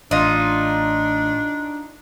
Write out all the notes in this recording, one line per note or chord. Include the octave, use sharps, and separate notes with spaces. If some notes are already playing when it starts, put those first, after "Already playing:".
A1 D4 D#4 F4